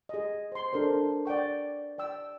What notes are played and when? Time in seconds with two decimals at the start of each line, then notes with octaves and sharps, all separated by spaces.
0.09 G#4 D#5
0.52 C5 C6
0.73 D4 A4 A#4 C5
1.25 D5 F#5 G5 C#6
1.98 D5 G5 E6